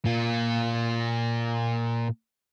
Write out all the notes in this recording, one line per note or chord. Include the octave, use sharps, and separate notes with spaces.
A#2 F4